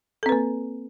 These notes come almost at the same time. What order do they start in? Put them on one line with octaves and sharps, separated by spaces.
A4 C4 B4 A#3